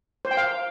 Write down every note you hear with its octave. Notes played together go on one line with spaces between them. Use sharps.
C5
G5
F5